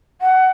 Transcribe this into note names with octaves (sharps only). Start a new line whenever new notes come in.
F#5